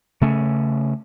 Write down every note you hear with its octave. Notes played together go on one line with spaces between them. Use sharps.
C#3 A3 C#4